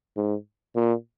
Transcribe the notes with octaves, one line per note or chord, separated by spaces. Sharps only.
G#2
A#2